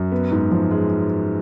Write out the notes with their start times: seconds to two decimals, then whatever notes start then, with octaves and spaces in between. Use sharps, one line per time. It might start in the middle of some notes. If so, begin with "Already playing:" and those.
Already playing: F#2
0.12 B3
0.31 G#2
0.51 F3
0.71 G#3